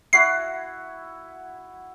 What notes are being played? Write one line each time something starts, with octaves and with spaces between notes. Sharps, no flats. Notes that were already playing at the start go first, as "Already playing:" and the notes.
E4 F#4 F#5 C7